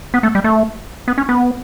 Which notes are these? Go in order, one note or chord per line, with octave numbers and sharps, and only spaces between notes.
B3
A3
G3
A3
B3
C#4
B3